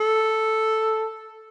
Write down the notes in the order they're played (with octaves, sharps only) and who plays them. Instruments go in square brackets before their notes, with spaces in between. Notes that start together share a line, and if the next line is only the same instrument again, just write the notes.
[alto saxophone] A4